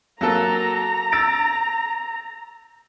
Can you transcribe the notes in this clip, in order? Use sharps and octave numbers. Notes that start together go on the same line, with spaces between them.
F#3 A#3 A4 A#5
E6 A6 D7